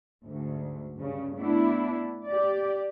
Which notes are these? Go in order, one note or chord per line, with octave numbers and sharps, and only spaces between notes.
D2 G#2
G2 C#3
A3 B3 D4 E4
G4 D5